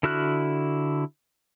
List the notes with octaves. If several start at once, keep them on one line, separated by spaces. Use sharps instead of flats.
D3 E4 F#4 F6 F#6